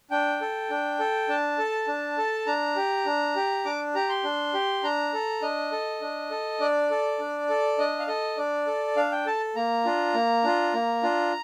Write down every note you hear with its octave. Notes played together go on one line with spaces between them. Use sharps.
D4 G5
A4
D4
A4
D4 A5
A4
D4
A4
D4 A#5
G4
D4
G4
D4 D6
G4 A#5
C6
D4
G4
D4 A#5
A4
D4 D#5
A4
D4
A4
D4 D5
A4
D4
A4
D4 D#5
F5
A4 D#5
D4 D5
A4
D4 F5
G5
A4 A5
A#3 A#5
D4 F4
A#3
D4 F4
A#3
D4 F4